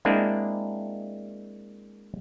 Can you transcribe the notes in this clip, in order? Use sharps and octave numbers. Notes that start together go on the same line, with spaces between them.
G#3 A#3 C4 D4 E4